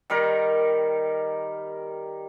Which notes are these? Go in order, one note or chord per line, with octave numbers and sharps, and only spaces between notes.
D#3 G3 A#4